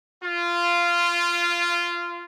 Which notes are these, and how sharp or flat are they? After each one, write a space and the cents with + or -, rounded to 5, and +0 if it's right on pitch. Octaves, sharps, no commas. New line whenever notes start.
F4 -15